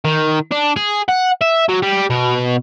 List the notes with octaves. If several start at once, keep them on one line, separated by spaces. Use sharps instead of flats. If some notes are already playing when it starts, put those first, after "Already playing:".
D#3
D4
G#4
F#5
E5
F#3
G3
B2